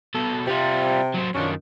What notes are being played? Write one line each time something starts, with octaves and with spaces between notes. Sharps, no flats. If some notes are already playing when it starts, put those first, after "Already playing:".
B2 A4
C3 G3 F4
F#3 C4
F#2 D#3 F3 C#4 D4